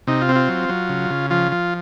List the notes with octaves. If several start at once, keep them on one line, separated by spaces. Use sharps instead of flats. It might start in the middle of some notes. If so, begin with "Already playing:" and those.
C3 D#4
F4
C4
F4
F#3
F#3
C#3
C#3
F3 F4
F3